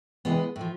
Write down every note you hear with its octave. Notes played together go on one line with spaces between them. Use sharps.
E2 C3 E3 G#3 B3
A2
F3